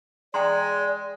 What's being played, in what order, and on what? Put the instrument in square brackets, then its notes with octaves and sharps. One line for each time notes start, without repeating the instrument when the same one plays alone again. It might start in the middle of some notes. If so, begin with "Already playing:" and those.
[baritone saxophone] G#3 [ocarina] D5 [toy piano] G5 A#5 C6